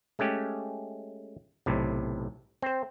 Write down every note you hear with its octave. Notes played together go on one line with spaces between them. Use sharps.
G#3 A3 C#4 G4
B1 A2 C3
C4 C5